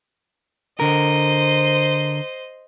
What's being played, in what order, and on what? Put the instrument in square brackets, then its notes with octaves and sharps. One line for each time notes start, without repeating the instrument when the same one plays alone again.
[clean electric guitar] D3 A#4 [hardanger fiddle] C5 D#5